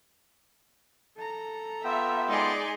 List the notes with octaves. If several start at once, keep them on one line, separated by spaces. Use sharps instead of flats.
A4 A#5
B3 F4 E5 G5
G#3 D#4 G#4 D5 C6